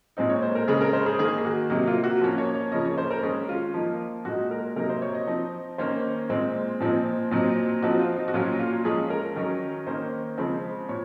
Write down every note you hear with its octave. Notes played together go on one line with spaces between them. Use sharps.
A#2 G#3 C4 D#4
C#5
C5
A#4
C#3 G#3 C#4 G#4
A#4
C5
G#4
D#3 A#3 D#4 G#4
G#4
F#4
C3 F#3 A#3 D#4
F4
F#4
F3 A#3 C#4
C#5
C#5
C#3 F3 A#3 C#4 D#5
C#5
C5
A#4
D#3 G#3 C#4 G#4
F4
F3 A#3 D#4
A#2 G#3 D#4 F#4
A#4
C3 F#3 A#3 D#4 A#4
C5
C#5
D#5
F3 C4 D#4
D#3 A#3 C#4 C5
A#2 G#3 C4
A#2 F3 C4 D#4
A#2 F#3 C4 D#4
F3 C4 D#4 F#4
F4
D#4
F#4
A#2 F#3 C#4 F4
F4
F3 G#3 C#4 G#4
A#4
D#3 F#3 C#4 A#4
D#3 A#3 C#4 C5
C#3 F3 G#3 C4
A#2 C#5